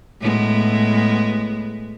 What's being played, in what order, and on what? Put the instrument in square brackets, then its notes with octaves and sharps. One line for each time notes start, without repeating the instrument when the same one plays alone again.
[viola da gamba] A2 G#3 B3